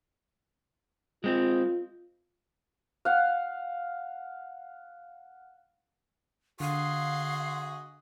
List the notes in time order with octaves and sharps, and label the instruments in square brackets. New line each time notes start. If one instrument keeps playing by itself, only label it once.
[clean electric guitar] G#3 C4 [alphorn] F4
[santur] F5 F#5
[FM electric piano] D3 [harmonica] F#4 G#4 D#5 [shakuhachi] F5 [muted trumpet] C6